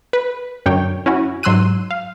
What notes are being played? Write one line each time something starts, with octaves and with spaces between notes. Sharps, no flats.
B4
F#2 D3 C#5 G5
C#4 E4 F#4
G#2 F#3 C6 E6 F#6 D#7
F5